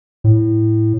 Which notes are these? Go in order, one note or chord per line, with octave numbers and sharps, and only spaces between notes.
A2